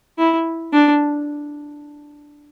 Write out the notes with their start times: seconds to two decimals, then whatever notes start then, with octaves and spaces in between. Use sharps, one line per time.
0.19 E4
0.73 D4